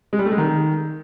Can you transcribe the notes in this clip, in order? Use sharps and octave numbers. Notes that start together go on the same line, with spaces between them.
G#3
G3
A3
G#3
D#3